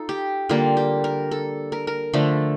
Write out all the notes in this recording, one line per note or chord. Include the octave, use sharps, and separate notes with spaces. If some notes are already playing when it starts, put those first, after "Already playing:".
Already playing: D#4 F4 A4
G4
D3 G3 A#3 F4
G4
A#4
A4
A#4
A#4
D3 F3 A3